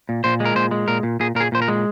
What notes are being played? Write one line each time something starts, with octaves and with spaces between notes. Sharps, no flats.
A#2
A#2 C5
G#3
A#4
A#2 C5
G#3
A#2 A#4
A#2
A#2 G#4
A#2 A#4
G#4
A#2 C5
A#4
G#3